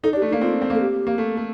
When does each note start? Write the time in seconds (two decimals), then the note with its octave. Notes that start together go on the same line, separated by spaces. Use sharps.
0.03 D#4 A4
0.13 D4
0.16 G4
0.22 A3
0.29 D#4
0.32 A#3
0.41 C4 F4
0.62 C4
0.70 A#3 A4
0.80 G4
1.07 A#3
1.18 A3
1.37 A3